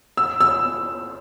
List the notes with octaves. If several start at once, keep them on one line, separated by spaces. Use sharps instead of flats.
E6
E6